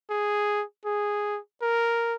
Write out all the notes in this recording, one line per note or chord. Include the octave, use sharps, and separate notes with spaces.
G#4
G#4
A#4